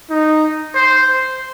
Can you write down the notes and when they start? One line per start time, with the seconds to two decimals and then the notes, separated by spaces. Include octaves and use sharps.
0.10 D#4
0.74 C5